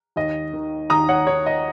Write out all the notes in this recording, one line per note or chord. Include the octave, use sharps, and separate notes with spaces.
D#2 D#5
D#3
D#2 A#5 D#6
C#5 F#5
D#3 C#5
D#5